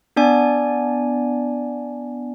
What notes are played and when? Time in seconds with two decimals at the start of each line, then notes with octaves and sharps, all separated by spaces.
0.16 B3 D4 D5 G#5